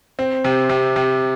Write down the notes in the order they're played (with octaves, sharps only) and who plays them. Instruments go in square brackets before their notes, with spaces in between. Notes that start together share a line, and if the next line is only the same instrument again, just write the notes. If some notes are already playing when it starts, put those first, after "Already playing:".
[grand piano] C4
C3
C3
C3